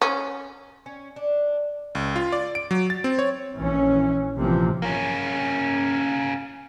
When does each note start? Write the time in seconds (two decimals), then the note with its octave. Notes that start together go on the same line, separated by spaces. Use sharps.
0.02 C#4
0.86 C#4
1.16 D4
1.95 C#2
2.16 F4
2.32 D5
2.55 D7
2.71 F#3
2.90 A6
3.04 C4
3.19 C#5
3.59 A#1 E3 C#4
4.38 A#1 C3 E3 F3 A#3 C4
4.82 A#3 C#4